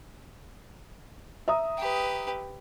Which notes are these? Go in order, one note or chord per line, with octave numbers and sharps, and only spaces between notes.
E5 A#5 D#6
G4 B4